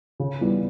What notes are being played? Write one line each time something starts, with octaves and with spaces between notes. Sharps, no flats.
C#3
E3 G3 B3